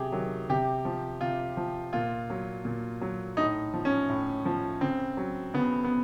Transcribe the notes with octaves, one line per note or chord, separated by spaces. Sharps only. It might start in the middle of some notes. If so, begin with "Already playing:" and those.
Already playing: C3 F#3 G4 G#4
D#3 F#3
C3 G4
F3
C3 F4
F3
A#2 F4
F#3
A#2
F#3
A2 D#4
F3
C#4
A2
F3
C#3 C4
F#3
C#3 B3
B3